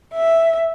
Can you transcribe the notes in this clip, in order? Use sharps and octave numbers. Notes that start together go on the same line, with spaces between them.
E5